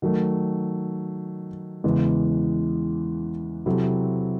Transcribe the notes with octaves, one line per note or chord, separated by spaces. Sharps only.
D#3 F#3 A3
E2 C#3 E3 G#3
C3 F#3 C4 E4 A4